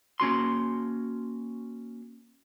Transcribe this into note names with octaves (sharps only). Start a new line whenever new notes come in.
A#3 C#4 F#4 C6